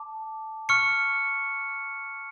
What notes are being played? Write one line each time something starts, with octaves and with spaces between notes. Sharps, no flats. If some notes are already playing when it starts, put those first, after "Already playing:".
Already playing: A5 D6
C#6 F6 C#7